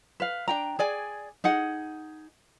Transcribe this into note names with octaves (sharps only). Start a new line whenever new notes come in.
B4 F5
D4 G5 A#5
G#4 D5 G#5
D#4 G#4 F#5